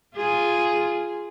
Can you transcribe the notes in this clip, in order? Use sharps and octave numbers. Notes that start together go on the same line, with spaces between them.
F4 G#4